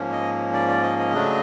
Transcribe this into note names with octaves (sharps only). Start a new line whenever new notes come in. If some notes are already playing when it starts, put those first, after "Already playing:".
Already playing: G#2 F3 A#3 C#4
D#5
D5
D5
D#5
D#5
C#3 F#3 A3 D4